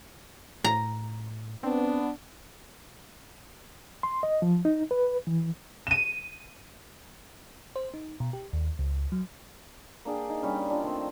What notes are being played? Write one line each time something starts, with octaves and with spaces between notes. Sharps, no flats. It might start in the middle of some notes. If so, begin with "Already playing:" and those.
A2 A#5
B3 C4 D4
C6
D#5
F3
D#4
B4
E3
D#7 E7
C5
D#4
B2
G4
D#2
C#2
F#3
A#3 D4 G#4 G5
D#4
G3 C#4
D4 F4
D#3 A3 C4